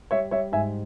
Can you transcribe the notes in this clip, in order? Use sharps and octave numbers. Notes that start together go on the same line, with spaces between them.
G3 C#5 E5
G3 C#5 E5
G#2 E5 G#5